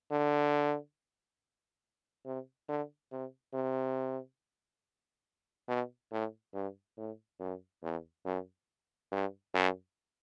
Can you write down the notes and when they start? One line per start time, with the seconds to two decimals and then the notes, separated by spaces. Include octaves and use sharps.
0.11 D3
2.26 C3
2.69 D3
3.11 C3
3.54 C3
5.68 B2
6.12 A2
6.54 G2
6.97 A2
7.40 F#2
7.83 E2
8.25 F#2
9.12 G2
9.54 F#2